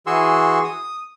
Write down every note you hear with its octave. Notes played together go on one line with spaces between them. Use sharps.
E3 F#4 G#4 C6 C#6 E6
D#6